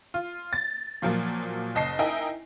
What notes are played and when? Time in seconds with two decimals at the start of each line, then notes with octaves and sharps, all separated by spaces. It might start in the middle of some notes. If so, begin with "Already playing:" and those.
0.14 F4
0.53 A6
1.02 A#2 F3 F#3 A#3
1.75 F#1 D#5 A5 C7
1.99 D#4 E4 A#4 D#5 G5 G#5